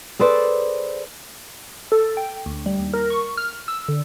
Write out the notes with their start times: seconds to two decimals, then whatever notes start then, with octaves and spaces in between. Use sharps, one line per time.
0.19 G#4 A4 B4 C5 D5
1.92 A4
2.17 G5
2.46 D2
2.66 G3
2.79 D#2
2.94 A#4
3.10 C#6
3.37 F6
3.68 E6
3.88 D3